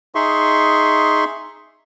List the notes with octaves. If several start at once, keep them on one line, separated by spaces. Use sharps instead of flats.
D#4 G#4 E5 C6 C#6